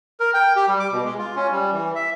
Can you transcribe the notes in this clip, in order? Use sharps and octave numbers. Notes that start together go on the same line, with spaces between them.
A#4
G5
G4
G3
D6
B2
G#3
F4
C#4
G3
E3
E5